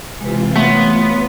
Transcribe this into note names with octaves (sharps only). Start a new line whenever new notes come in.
C3 E3 G#3 F4 B4
A3 B3 C#5 F5 C6